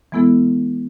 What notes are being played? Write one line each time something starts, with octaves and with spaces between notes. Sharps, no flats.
E3 G#3 B3 E4 A4